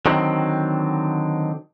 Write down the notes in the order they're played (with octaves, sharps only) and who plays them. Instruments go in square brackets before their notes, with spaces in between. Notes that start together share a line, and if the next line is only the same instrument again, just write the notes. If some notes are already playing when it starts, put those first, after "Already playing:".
[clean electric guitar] D3 D#3 F#3 C4